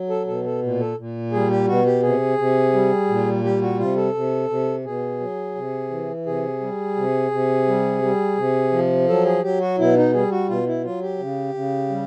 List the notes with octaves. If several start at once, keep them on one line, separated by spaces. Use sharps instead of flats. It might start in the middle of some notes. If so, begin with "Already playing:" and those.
Already playing: F#3
A4
B2 A4
A4
A#2
A4
A#2
G3 G#4
G4
B2 F#4
G4
C3 G#4
C3
G3
A#2
G3 G4
F#4
C3 F4
A4
C3
C3
B2 G#4
F#3
C3
E3
C3 G#4
G3
C3
C3
G3
G3
C3
F3
F#3 A4
G#4
F#3 G4
F#4
B2 E4
D#4
G3 G#4
F#4
B2 F4
E4
F#3 F4
G4
C#3
C#3
G3